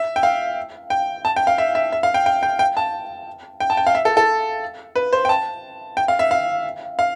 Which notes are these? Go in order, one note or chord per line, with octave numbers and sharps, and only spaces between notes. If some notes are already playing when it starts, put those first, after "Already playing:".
Already playing: E5
G5
F5
G5
A5
G5
F5
E5
E5
E5
F5
G5
G5
G5
G5
A5
G5
A5
G5
F5
E5
A4
A4
B4
C5
G5
A5
G5
F5
E5
F5
F5